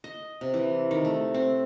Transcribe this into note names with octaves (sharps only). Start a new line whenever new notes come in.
D#5
C3
E3
D#3
A3
C4